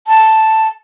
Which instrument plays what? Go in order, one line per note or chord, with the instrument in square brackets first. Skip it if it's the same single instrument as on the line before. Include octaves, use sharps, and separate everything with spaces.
[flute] A5